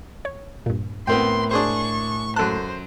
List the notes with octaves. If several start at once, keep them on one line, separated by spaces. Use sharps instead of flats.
C#5
G2 A#2
A2 B3 C4 A#4 G5 C6
D4 G#4 C5 C#6
F#2 A4 C5 A5 F#6